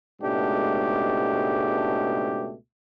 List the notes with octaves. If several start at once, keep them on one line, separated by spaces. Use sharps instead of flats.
C#2 G#2 B2 A3 D4 G4